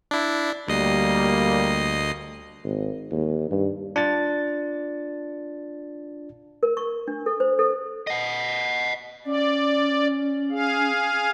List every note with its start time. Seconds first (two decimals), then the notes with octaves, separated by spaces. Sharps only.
0.11 D4 E4
0.68 D2 G3 A#3 D#5 C7
2.65 G#1
3.11 D#2
3.51 G2
3.96 D4 F4 A6
6.63 A#4
6.77 C#6
7.08 D4
7.26 A4
7.40 C5
7.59 A4
8.07 D#5 F#5
9.25 C#4 D5
10.51 G#4 F5